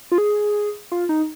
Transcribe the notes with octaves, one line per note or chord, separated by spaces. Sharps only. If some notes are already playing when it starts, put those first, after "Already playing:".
F4
G#4
F4
D#4